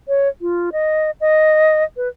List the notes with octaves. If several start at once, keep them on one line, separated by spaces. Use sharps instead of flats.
C#5
F4
D#5
D#5
B4